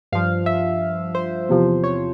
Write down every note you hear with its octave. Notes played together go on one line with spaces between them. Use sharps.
G2 F3 F5
E5
C5
E2 C3 F3
C#5